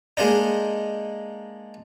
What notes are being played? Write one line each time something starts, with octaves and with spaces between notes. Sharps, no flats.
G#3 A#3 D4 D#4